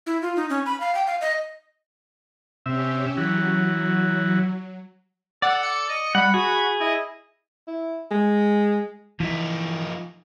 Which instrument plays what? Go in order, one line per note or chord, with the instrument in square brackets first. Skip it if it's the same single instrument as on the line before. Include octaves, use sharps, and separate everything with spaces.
[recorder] E4
F4
D#4
C#4
B5
F5
G5
F5
D#5
[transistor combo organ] C3 E5 [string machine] C#4 G4
[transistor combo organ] E3 F#4 [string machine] F#3
[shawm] A4 [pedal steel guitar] D5 [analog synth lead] F#5
[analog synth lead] C#7
[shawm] D#5
[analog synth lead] G3 [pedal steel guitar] F#5 [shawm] B5
[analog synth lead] F#4 [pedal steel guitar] G#4
[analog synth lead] E4 [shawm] D#5
[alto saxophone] E4
G#3
[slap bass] E3 [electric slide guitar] F3 D#4